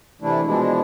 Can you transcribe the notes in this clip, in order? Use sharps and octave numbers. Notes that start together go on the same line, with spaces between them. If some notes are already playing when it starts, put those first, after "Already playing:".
C3 E3 A3 D4 E4
B2 E3 F3 G#3 D4 E4